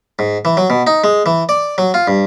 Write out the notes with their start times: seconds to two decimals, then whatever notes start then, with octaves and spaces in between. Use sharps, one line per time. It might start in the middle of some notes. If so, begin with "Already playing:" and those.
0.19 G#2
0.45 E3
0.57 F#3
0.70 B2
0.87 D#4
1.04 G#3
1.26 E3
1.49 D5
1.78 F#3
1.94 F4
2.07 G2